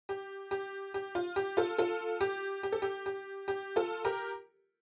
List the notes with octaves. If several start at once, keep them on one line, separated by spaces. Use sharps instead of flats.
G4
G4
G4
F4
G4
F4 A4
F4 A4
G4
G4
A4
G4
G4
G4
F4 A4
G4 A#4